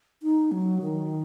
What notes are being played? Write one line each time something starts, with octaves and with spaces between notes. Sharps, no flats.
D#4
F#3
D#3